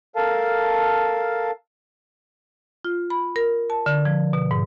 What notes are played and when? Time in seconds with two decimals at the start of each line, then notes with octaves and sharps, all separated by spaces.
0.16 A4 A#4 F5 A5
2.85 F4
3.10 B5
3.36 A#4
3.70 A5
3.86 D3
4.05 F3
4.33 B2
4.51 G#2